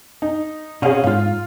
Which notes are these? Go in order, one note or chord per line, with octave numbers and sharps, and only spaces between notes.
D#4
B2 C4 C#4 G#4 F5 F#5
G#2 F4 F5